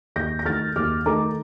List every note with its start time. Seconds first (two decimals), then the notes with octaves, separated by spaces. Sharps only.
0.16 D#2 G6 A#6
0.39 A#6
0.45 D#3 A3 F6 A6
0.76 D#2 D6 F6
1.06 D#3 A3 A#5 D6